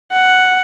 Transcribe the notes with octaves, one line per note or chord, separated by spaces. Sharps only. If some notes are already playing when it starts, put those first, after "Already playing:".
F#5